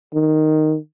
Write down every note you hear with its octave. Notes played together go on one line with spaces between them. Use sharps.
D#3